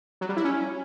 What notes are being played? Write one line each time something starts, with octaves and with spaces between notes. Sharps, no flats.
F#3
G3
E4
C#4